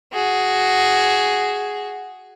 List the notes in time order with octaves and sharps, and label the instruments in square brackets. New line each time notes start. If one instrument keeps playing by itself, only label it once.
[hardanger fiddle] F#4 G#4